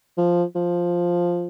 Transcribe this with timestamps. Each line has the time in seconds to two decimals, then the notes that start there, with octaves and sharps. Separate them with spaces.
0.18 F3
0.55 F3